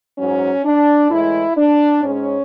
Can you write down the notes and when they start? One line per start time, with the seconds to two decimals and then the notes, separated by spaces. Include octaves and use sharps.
0.18 G#2 F#3 C#4
0.65 D4
1.11 A2 E3 G#3 E4
1.57 D4
2.04 G#2 G#3 C#4